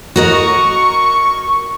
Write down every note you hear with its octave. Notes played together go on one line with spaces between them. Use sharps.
F#4 A#4 D#5
C#6